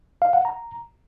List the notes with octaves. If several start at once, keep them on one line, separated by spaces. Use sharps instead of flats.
F5
F#5
A#5